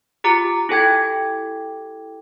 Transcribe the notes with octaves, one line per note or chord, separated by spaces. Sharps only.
F4 G4 A#5 D6
E4 G4 A4 G5 D6 G#6